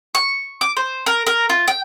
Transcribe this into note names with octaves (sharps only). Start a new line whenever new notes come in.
C#6
D6
C5
A#4
A#4
F4
G5